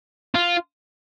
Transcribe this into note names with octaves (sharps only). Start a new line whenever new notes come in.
F4